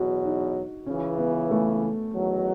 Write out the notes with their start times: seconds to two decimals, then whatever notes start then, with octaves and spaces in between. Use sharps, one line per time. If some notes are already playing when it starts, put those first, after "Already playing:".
Already playing: E2 B2 F#3 F#4
0.24 D#4
0.86 C#2 C#3 E3 C#4
1.18 B3
1.51 A3
2.13 E2 D#3 F#3